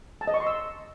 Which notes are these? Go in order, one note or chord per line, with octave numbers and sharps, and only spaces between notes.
A5
D#5
C#6
C6
E6